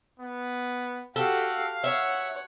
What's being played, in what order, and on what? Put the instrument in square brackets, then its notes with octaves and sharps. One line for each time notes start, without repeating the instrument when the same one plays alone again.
[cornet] B3
[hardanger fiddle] F#4 G4 [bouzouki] A4 [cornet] F5
[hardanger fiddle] C#5 F#5 [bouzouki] E5